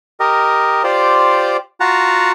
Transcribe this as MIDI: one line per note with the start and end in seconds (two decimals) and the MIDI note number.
0.20 0.83 67
0.20 0.83 70
0.20 0.83 75
0.84 1.57 65
0.84 1.57 67
0.84 1.57 72
0.84 1.57 74
1.80 2.32 65
1.80 2.32 66
1.80 2.32 78
1.80 2.32 81
1.80 2.32 82